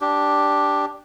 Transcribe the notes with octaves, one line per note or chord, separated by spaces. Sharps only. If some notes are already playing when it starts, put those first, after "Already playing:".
D4 G4